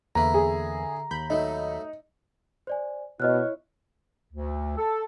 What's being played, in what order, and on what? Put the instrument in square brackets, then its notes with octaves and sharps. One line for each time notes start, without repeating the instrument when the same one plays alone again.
[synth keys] E2 A#3 B4 [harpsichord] D3 E4 [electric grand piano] A#5
[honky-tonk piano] G#4
[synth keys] D#2 B5 G6
[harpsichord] F#3 A3 [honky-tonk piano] D#4
[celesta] C5 D5 G#5
[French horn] B2 [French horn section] E4 C#5 [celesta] D#5 F6 F#6
[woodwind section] D2
A4